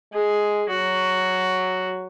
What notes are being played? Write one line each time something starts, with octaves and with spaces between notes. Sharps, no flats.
G#3 G#4
F#3 F#4